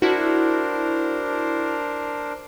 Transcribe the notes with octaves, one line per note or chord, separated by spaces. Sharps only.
D4 E4 F#4 A#4 C5